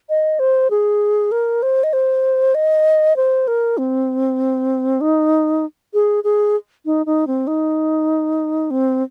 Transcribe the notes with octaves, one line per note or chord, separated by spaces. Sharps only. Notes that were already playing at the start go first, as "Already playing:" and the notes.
D#5
C5
G#4
A#4
C5
D#5
C5
D#5
C5
A#4
C4
D#4
G#4
G#4
D#4
D#4
C4
D#4
C4